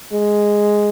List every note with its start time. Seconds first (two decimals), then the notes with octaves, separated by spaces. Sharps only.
0.12 G#3